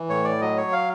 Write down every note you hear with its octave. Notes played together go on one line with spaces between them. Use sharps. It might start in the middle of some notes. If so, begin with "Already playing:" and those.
Already playing: E3
A2 C#5
D5
F#3 D#5
C#5
F5